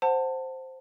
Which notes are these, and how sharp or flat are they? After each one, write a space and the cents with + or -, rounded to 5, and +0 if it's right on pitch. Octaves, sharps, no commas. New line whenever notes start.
C5 +0 F#5 +0 A5 +20